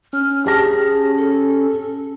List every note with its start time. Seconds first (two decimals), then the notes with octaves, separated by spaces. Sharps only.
0.13 C#4 F6
0.46 G4 G#4 A5 A#6
1.18 A4